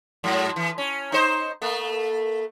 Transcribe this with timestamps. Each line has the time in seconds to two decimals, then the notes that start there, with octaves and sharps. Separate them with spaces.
0.24 G#2 F#3
0.56 E3
0.78 C#4
1.12 D#4 C5
1.62 A3 A#3